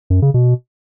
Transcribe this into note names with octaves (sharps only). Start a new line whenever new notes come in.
F#2
C#3
B2